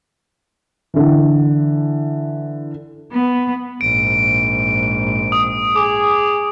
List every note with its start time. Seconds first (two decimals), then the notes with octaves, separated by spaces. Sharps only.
0.94 D3 E3
3.13 B3
3.81 A#1 G#2 D7
5.32 D#6
5.76 G#4 D6